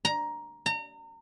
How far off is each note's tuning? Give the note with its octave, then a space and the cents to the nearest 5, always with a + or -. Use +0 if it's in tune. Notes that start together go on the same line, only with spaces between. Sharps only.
A#5 +10
A#5 -35